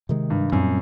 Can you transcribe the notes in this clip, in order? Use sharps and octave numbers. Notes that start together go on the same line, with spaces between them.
C3 D#3 G#3
G2
F#2 A#2 G3 C4